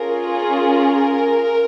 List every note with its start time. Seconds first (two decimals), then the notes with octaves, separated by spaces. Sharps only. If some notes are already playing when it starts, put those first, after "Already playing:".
Already playing: C#4 F4 G#4 A#4
0.36 A#4